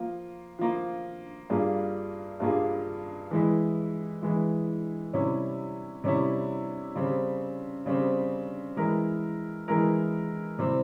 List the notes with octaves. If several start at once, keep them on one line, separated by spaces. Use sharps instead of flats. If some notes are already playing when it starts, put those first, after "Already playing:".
Already playing: F3 A#3 F4
F3 A#3 F4
G2 G3 A#3 F4 G#4
G2 G3 A#3 F4 G#4
E3 G#3 E4
E3 G#3 E4
C3 G3 C#4 E4
C3 G3 C#4 E4
C#3 G3 C4
C#3 G3 C4
E3 G#3 E4 A#4
E3 G#3 E4 A#4
C3 G3 C4 E4